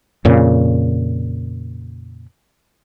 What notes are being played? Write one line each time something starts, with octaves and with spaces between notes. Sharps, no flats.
F2 A#2 C#3